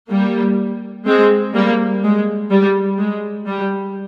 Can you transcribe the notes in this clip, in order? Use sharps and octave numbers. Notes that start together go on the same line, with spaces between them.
G3 A#3
G#3 C4
G3 A#3
G#3
G3
G#3
G3